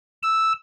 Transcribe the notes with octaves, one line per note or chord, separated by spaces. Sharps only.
E6